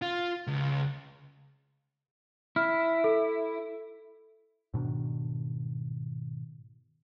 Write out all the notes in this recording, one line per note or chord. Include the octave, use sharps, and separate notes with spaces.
F4
C#2
E4 F6
A4
G#2 B2 D#3 D4